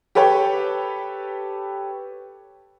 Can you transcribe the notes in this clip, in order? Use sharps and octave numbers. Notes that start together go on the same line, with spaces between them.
G4 A4 B4 C#5 G5